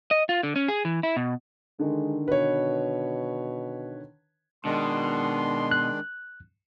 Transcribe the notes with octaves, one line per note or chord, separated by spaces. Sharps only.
D#5
F4
D3
C#4
G#4
E3
E4
B2
D3 D#3 G#3
B2 B4 C#5
B2 D#3 G#3 D4 C6
F#6